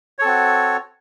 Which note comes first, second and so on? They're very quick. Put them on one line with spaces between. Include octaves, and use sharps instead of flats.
C#5 A4 C4 F#4